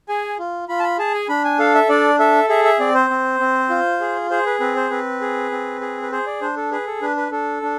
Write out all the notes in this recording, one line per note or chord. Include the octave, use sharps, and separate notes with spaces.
G#4 G#5
F4
F4 B5
A5
B5
G#4 A5
G#5
D4 B5
G#5
A4 F5
E5
D4 D5
A4 E5
G#4 E5
E5
C4 D5
C5
C4
C4
F4
G#4
G#4 C5
B4
C4 B4
C5
C4 B4
G#4
C4
G#4
B4
G#4 C5
D5
D4 C5
A4
G#4 B4
A4
D4 B4
B4
D4 A4
D4